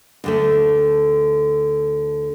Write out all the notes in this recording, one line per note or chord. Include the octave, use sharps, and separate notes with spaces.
D2 D3 A3